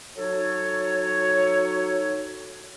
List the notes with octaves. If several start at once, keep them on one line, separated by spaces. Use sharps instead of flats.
F#3 D#4 F#4 A4 C#5